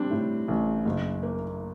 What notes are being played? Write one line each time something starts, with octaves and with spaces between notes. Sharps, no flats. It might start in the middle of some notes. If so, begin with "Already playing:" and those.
Already playing: G3 C4 D4
A2
A1
F#1
A#3